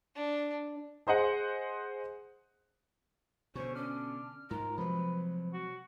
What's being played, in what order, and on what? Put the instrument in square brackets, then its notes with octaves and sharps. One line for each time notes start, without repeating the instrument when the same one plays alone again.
[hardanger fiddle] D4
[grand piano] G#4 C5 D#5 F#5
[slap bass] B2 D3 [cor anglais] C#4 [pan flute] C5 [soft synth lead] C#6
[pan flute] C#4 [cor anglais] D4 [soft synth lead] F6
[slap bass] G#2 [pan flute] G#3 [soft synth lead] F4 [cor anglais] A#4
[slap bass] C3 F#3 [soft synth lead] F3 [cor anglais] B4
[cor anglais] F#4